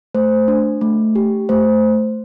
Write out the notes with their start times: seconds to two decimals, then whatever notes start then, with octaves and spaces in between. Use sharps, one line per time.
0.14 A3 C5
0.48 D4
0.81 A3
1.15 G4
1.49 A3 C5